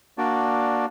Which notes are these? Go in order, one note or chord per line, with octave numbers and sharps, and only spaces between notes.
A#3 D4 F#4 D5